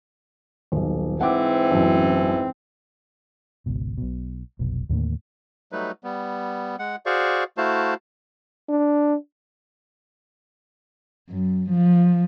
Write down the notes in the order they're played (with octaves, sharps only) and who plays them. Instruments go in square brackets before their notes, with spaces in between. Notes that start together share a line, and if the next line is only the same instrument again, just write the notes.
[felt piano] D#1 B1
[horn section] G#2 E3 C4 [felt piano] F#5 G5 D6
[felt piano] A1 F#2
[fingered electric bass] G#1 C#2 B2
B1 B2
F1 B1 B2
D#2 A2 D3 A#3
[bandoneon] F#3 G3 A3 D#4 B4
G3 B3
G#3 F#5
F#4 G#4 C5 D5 F5 C#6
A3 E4 F#4 C5 F5 A5
[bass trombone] D4
[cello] F#2
F3